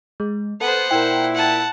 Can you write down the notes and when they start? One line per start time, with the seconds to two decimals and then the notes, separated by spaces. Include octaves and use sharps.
0.20 G#3
0.61 B3 A4 C5 F#5
0.91 A#2 E4 A#4 G5
1.35 F#5 A5